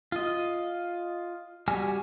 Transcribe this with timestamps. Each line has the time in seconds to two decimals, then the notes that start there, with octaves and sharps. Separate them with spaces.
0.12 F4 D#5
1.68 G3 F#4 G#5 F6